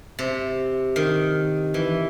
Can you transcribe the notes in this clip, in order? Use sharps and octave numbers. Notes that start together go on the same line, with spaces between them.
C3
D#3
E3